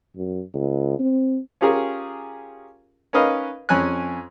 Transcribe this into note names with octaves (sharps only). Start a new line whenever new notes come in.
F#2
C#2
C4
C#4 F4 G4 G#4 A#4
C#4 D#4 A#4 B4 D#5 F5
F2 C#4 G#5 F#6